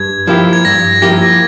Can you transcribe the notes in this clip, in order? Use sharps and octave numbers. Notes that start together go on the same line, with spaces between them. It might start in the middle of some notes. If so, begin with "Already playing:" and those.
Already playing: G2 G#6
F3 A#3 E4 G4
G#6
G2 A#6
F3 A#3 E4 G4 A#6